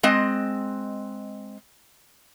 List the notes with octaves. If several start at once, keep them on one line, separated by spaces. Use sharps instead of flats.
G#3 C4 D#5